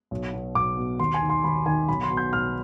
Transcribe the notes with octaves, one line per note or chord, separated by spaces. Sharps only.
B1
B2
B1 D6
B2
D#2 C6
G#5
D#3
C6
D#2 B5
D#3 G#5
B1 B5
C6
B2
G6
B1 F6